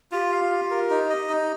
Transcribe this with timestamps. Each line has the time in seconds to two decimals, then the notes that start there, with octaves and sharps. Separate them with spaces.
0.12 F4 G4
0.32 F5
0.51 F4
0.71 A#4
0.90 D#4
1.10 D#5
1.29 D#4